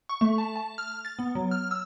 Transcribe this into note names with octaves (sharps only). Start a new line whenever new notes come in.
C#6
A3
A5
A5
F6
A6
B3
F#3
F6
E6